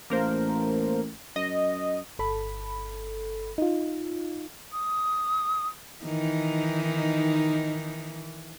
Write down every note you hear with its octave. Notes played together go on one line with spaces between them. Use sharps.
A1 A#3 A#4 C5
F#2 D#5
G1 A4 B5
D#4 F4
D#6
D#3 E3 D#4